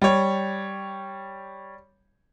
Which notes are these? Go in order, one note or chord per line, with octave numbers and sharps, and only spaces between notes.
G3 C#5